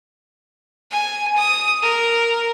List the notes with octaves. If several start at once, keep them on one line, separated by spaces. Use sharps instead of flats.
G#5
D#6
A#4